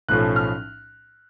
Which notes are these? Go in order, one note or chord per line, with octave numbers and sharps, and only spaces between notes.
B1 A2 F3 A3 C#4 F#6
F6